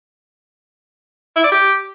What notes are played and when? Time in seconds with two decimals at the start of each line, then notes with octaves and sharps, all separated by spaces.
1.36 E4
1.44 D5
1.52 G4